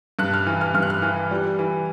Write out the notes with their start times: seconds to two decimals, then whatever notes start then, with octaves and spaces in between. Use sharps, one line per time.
0.19 G2 F#6
0.34 F6
0.46 E3
0.61 F6
0.74 G2 F6
0.82 F#6
0.90 F6
1.02 E3
1.31 G3
1.59 E3